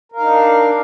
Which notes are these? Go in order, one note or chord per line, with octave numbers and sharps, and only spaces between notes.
D4 D#4 A#4 F5